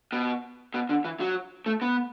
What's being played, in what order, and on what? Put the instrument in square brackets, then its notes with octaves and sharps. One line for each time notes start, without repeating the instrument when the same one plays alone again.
[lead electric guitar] B2
B2
D3
E3
F#3
A3
B3